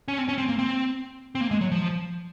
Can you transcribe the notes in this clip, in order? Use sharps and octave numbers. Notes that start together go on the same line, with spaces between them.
C#4
C4
C#4
C4
A#3
C4
C4
A#3
G#3
F#3
F3